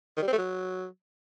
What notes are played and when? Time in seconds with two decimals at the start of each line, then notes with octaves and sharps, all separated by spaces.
0.17 D#3
0.22 G3
0.28 C4
0.33 A3
0.38 F#3